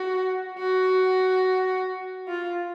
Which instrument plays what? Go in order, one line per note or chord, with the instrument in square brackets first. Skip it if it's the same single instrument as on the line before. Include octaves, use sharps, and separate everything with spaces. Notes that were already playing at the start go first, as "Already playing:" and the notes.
Already playing: [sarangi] F#4
F#4
F4